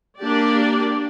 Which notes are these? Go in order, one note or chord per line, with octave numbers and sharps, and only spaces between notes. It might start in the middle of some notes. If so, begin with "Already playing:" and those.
A#3 D4 G4 D5